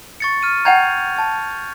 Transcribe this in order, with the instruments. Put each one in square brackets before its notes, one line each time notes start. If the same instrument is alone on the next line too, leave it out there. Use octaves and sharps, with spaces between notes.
[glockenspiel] C#6 A6 C#7
F6 D#7
[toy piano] F#5 G5 A#5 [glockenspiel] G6 G#6 F7
[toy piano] A5